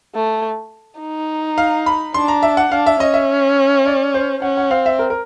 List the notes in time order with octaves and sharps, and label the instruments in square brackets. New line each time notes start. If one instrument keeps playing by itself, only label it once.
[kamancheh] A3
D#4
[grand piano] F5
B5
[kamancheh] D4 [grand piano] C6
[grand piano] A#5
E5
F#5
[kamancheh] D4 [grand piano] F5
[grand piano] E5
[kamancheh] C#4 [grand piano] D#5
[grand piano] E5
D5
C5
[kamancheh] C#4 [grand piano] F#5
[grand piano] F#5
[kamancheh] C4 [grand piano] F5
[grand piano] E5
A#4
A#4